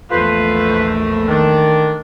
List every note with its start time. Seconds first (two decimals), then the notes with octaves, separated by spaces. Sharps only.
0.11 A#1 E2 A3 F4 B4 C5
1.28 D#3 D4